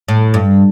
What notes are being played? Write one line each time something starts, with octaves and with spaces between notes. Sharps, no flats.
A2
G2